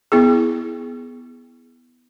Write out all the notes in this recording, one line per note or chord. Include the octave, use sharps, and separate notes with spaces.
B3 E4 G#4